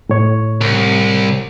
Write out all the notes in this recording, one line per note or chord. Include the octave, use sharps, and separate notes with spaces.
A2 C#5
C2